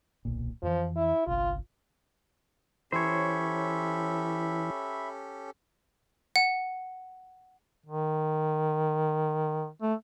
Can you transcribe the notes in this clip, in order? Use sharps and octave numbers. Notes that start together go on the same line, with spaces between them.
D1 B1 A#2
F2 E3 F3
E4
G1 C2 F4
E3 C#4 G4 A4 C5 C#5 E5 B5
F#5
D#3
A3